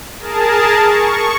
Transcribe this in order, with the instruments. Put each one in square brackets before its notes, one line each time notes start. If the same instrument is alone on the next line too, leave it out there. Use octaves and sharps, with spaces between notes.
[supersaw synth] G#4 A#4 A5
C#6